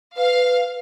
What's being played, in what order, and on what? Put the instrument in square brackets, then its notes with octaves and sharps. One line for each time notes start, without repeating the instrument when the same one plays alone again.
[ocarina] B4 [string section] F5